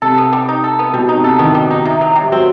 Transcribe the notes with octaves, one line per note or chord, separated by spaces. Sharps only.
C3 A4
B3
G3
D#4
A4
B3
B2 G3
D#4
C3
A4
D#3 B3
G3
D#4
C3
F#3
C3
G3
F#3 C4